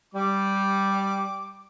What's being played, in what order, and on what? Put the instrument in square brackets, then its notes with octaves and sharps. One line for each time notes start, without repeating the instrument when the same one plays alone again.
[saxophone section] G3 [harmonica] D6